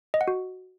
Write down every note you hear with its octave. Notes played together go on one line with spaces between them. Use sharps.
D#5
F#5
F#4